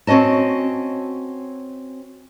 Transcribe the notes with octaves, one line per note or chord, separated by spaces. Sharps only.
C4 C#4 F#4 D#5 A5